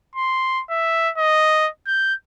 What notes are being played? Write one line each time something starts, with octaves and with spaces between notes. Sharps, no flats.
C6
E5
D#5
G6